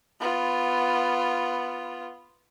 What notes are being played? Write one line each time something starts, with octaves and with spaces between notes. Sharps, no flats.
B3 F4